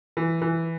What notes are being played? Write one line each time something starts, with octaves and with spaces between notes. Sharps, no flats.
E3
E3